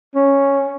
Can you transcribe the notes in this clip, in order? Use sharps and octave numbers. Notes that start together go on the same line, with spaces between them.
C#4